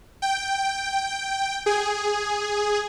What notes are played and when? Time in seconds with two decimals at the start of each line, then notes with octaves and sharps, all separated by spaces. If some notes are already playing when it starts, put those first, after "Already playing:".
0.22 G5
1.66 G#4